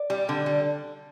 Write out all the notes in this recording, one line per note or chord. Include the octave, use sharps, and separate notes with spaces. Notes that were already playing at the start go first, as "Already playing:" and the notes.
Already playing: D5
G3
D3
G3